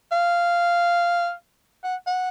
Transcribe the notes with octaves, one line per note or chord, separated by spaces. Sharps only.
F5
F#5
F#5